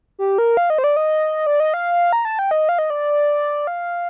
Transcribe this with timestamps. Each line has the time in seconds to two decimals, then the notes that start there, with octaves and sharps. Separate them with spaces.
0.19 G4
0.38 A#4
0.57 F5
0.70 D#5
0.78 C5
0.84 D5
0.97 D#5
1.47 D5
1.60 D#5
1.74 F5
2.13 A#5
2.25 A5
2.39 G5
2.51 D#5
2.69 F5
2.79 D#5
2.90 D5
3.67 F5